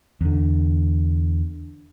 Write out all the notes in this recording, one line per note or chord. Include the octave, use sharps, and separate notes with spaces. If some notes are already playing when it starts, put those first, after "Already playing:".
E2 D3